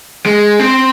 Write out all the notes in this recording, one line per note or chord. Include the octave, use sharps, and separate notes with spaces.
G#3
C4